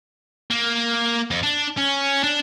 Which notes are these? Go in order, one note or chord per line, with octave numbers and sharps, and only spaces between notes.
A#3
F2
D4
C#4
D4